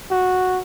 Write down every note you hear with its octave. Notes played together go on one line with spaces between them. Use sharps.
F#4